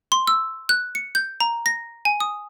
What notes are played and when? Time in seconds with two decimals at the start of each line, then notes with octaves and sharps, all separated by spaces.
0.12 C6
0.27 E6
0.69 F#6
0.95 C#7
1.15 G6
1.40 A#5
1.66 A#6
2.05 G#5
2.20 D#6